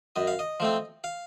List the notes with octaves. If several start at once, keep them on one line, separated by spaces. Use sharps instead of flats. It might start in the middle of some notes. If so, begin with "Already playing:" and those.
F#2 D#5
F5
D#5
F3 A3 C4
F5